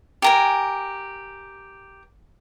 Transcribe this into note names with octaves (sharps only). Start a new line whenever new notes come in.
G4 A#4 G#5